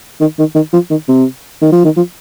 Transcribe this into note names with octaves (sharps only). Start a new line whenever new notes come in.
D#3
D#3
D#3
F3
D#3
C3
D#3
F3
D#3
F3